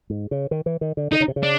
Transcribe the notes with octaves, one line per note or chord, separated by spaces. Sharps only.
G#2
C#3
D#3
E3
D#3
D3
D3 D#4
C#3
C3
C#3
D4